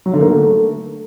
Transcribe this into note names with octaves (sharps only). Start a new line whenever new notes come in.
F#3
D3
A#3
A3